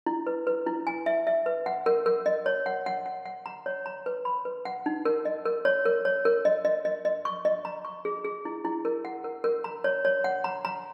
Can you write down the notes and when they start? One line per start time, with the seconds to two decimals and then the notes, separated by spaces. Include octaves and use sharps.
0.06 E4
0.27 B4
0.47 B4
0.67 E4
0.87 G#5
1.06 E5
1.27 E5
1.46 B4
1.66 F#5
1.86 A#4
2.06 A#4
2.26 D#5
2.46 C#5
2.66 F#5
2.86 F#5
3.06 F#5
3.26 F#5
3.46 A#5
3.66 C#5
3.86 A#5
4.06 B4
4.25 B5
4.45 B4
4.65 F#5
4.86 D#4
5.05 A#4
5.25 D#5
5.46 A#4
5.65 C#5
5.86 A#4
6.05 C#5
6.25 A#4
6.45 D#5
6.65 D#5
6.85 D#5
7.05 D#5
7.25 C#6
7.45 D#5
7.65 A#5
7.85 C#6
8.05 G#4
8.25 G#4
8.45 E4
8.65 E4
8.85 A#4
9.05 F#5
9.24 A#4
9.44 A#4
9.64 A#5
9.84 C#5
10.05 C#5
10.24 F#5
10.44 A#5
10.65 A#5